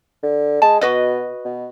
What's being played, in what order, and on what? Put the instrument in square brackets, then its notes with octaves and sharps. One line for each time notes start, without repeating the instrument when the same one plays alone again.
[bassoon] D3
[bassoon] G#3 [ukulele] A5
[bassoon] B2 [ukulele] F#4 B4 D#5
[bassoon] B2